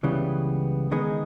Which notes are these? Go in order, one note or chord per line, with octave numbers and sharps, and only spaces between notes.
C#2 C#3 E3 G3 B3
D#3 G#3 B3 D#4 G#4